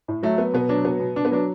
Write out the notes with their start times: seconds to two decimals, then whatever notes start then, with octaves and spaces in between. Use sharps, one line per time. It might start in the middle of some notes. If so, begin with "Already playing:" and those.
0.08 A2
0.23 F#3 A3
0.38 F#3 B3
0.54 B2 B3
0.69 F#3 D4
0.85 B2 B3
1.00 B2
1.15 B2 D4
1.25 B3
1.31 F#3 D4